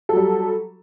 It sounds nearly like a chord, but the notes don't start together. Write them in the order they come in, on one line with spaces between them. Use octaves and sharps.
A4 F#3 G3